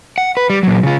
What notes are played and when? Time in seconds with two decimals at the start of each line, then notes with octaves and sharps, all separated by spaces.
0.18 F#5
0.37 B4
0.50 G3
0.63 A#2 F#3
0.83 C#3 F4